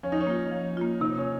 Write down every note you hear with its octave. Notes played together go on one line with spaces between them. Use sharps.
F3 C#4
D#4
C#4
A#3 F4
F3
A#3 F4
C3 D#4
C#4